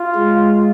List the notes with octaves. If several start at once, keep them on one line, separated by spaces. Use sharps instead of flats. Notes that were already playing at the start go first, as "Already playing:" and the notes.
Already playing: F4
G#3